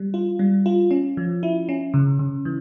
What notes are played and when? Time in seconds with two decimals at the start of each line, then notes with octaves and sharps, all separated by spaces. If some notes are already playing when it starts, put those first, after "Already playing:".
Already playing: G3
0.14 F4
0.39 G3
0.66 F4
0.91 C#4
1.17 F3
1.43 E4
1.69 C#4
1.94 C#3
2.19 C#3
2.45 E3